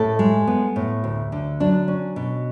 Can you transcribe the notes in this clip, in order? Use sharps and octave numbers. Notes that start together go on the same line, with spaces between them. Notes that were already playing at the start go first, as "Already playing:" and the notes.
Already playing: A2 A4
G#3
B3
A2
D2
D3
F#3 D4
C#4
B2